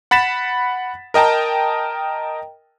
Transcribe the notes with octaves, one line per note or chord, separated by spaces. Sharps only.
F#5 B5 A6 B6 E7
A#4 D#5 G5 A5 A#5